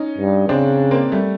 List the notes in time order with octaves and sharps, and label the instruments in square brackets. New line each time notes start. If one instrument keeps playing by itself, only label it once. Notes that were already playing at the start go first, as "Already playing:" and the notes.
Already playing: [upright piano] C#4 D#4
[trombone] G2
[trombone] C#3 [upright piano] C4 D4
[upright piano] A#3 C4
G3 A3